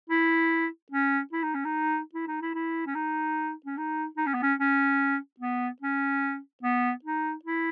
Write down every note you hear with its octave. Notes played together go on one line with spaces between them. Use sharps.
E4
C#4
E4
D#4
C#4
D#4
E4
D#4
E4
E4
C#4
D#4
C#4
D#4
D#4
C#4
B3
C#4
C#4
B3
C#4
B3
D#4
E4